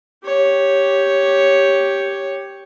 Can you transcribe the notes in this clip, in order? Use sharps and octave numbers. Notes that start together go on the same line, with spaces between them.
G4 C#5